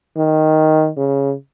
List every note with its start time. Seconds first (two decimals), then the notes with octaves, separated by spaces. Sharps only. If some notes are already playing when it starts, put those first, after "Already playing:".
0.17 D#3
0.97 C#3